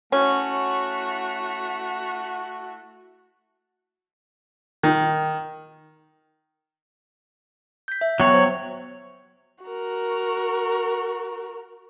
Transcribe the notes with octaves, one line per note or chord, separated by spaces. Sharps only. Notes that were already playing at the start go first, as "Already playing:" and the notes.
A3 C#4 E4 F#4
D#3
G6 B6
E5
F#3 B3 C#5 G5
C5
F#4 A#4